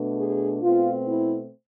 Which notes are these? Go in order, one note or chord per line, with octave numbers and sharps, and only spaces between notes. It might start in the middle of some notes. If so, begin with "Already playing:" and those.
Already playing: B2 A3 D4
G#4
B2 A3 C4 F4
E4